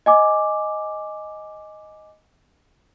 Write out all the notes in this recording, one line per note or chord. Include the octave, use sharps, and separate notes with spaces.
D#5 G#5 D6